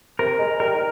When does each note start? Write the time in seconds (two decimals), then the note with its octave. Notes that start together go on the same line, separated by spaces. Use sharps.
0.19 C3 A#4
0.39 G#3
0.60 G3 A#4
0.74 D#3